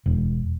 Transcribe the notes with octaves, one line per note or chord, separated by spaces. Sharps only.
E1